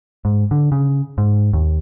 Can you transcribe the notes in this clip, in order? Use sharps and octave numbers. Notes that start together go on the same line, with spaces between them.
G#2
D3
C#3
G#2
D#2